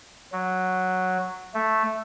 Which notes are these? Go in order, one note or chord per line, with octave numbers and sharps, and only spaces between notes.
F#3
A3